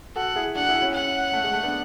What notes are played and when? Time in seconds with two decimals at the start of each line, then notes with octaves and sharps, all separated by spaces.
0.16 F#4 A4 F#5
0.36 E4 G#4
0.55 D4 F#4 F#5
0.69 E4 G#4
0.75 F#4
0.82 C#4 E4
0.95 F#5
1.33 A3
1.44 G#3
1.54 A3
1.63 B3 D4